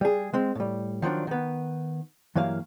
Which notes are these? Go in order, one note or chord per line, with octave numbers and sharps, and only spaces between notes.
G3 G#4
G#3 C4
A2 G3
D#3 F3 F#3 D4
D#3 B3
G2 E3 F#3 A#3 F5